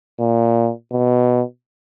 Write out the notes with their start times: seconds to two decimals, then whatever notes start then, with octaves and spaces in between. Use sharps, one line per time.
0.20 A#2
0.92 B2